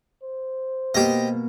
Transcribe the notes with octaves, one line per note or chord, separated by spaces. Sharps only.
C5
B2 A#3 G4 D#5